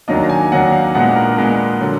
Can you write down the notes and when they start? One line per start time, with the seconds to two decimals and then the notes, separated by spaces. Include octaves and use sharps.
0.08 D#2 D#3 F#3 A#3 D4 D#5
0.29 G#5
0.52 D#2 D#3 F#3 A#3 D4 F#5
0.72 F5
0.94 A#2 G#3 B3 D4 F#5
1.16 A#4
1.38 A#2 G#3 B3 D4 A#4
1.81 D3 F#3